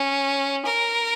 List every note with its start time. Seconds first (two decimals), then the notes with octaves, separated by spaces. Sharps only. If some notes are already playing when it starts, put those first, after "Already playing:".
Already playing: C#4
0.65 A#4